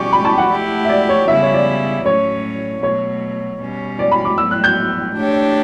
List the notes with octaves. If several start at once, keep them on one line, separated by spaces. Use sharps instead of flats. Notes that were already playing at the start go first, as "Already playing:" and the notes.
Already playing: B2 G3 C#4 G4 D5 C#6 D6
B5
A5
F#5
A3 E4 G4
E5
D5
C#5
C#3 G3 B3 E4 E5
C#5
D5
A2 F#3 A3 C#4 C#5
B2 F#3 A3 C#5
B2 G3 C#4
D5
B5
D6
A2 F#3 B3 E6
F#6
G6
A3 D4 G4 C#5